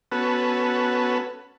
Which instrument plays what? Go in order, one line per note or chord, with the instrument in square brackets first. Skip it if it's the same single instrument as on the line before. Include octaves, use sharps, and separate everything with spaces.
[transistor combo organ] B3 C#4 F#4 A4 B4